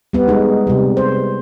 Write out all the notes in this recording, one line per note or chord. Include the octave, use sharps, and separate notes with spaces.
G3 B3
G#3 D#4
C3 G3
C5